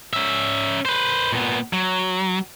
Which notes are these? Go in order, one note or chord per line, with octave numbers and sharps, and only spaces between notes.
C#4 E5
B4 C5
A#2 B3
F#3